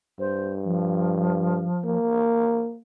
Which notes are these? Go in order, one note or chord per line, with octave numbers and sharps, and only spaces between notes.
G2 C5
F3
A#3